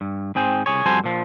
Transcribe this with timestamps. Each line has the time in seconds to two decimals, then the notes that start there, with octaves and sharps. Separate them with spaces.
0.01 G2
0.35 G#2 C4 G#4 G5
0.66 C2 G#4 C#5
0.86 F2 G3 F#4 A4 C5 G#5
1.04 A#2 F3